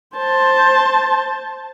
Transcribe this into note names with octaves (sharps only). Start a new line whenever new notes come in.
C5 A5